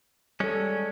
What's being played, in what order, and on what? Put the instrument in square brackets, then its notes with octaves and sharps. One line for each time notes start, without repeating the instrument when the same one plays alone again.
[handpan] G3 A4 [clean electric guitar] G#3 C#4